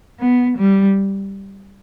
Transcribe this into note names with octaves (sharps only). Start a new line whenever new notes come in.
B3
G3